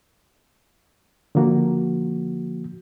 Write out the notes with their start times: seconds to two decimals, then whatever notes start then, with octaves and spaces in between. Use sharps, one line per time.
1.35 D3 F3 A#3 F#4